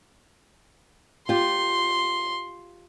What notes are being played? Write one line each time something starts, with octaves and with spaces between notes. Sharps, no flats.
F4 G4 C6